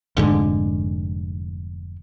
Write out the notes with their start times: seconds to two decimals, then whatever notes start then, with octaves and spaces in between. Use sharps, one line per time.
0.17 F1 G#2 D3